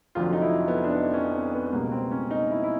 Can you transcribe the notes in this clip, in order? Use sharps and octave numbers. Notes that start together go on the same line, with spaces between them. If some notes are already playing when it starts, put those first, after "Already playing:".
F1 F2 D3 F#3 F4
D#4
E4
B3
D4
D#4
C#4
C4
B3
B3
C#2 B2 G3 A#3
C4
C#4
D#4
E4
E4